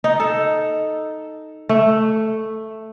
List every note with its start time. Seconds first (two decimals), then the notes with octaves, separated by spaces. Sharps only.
0.04 D#4
0.20 A4
1.69 A3